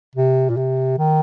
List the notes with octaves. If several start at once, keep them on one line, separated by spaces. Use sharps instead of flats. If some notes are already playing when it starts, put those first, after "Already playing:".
C3
A#2
C3
D#3